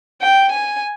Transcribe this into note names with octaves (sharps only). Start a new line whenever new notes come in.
G5
G#5